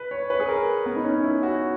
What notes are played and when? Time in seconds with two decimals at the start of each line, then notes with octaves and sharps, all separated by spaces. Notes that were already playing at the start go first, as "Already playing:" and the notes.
Already playing: B4
0.11 C#5
0.30 B4
0.40 G#4
0.49 A#4
0.86 B3
0.96 D#4
1.04 C#4
1.24 E4
1.43 F#4